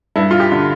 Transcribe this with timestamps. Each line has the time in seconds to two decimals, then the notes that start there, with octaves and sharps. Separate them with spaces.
0.16 G2 E4
0.31 F4
0.40 G4
0.52 D3